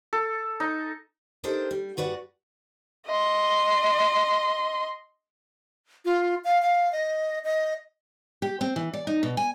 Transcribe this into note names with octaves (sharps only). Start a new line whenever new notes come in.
A4
D#4
D4 D#4 G4 A4 A#4 C5
G3
G2 F#4 B4 D5 F#5
D#5 C6
F4
F5
F5
D#5
D#5
G4
C4
E3
D5
D#4
B2
G#5